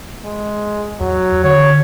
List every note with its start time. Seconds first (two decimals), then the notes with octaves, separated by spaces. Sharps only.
0.24 G#3
1.00 E2 F#3
1.44 D3 C#5